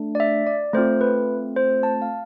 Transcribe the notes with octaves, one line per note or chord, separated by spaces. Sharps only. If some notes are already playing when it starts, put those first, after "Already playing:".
Already playing: A3 D4
D5
E5
D5
A3 C4 F4 C5
B4
C5
A5
F5